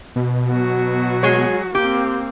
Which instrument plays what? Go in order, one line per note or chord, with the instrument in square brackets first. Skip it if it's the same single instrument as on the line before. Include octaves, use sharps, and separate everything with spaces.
[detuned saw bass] B2
[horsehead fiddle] F#3 F#4
[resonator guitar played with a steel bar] G#3 G#4 C#5
[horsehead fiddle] A#3 C4 [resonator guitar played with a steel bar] G4